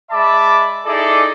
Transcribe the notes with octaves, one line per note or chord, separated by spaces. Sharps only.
G#3 D5 E5 A5 B5 D6
D#4 E4 G#4 A4 D5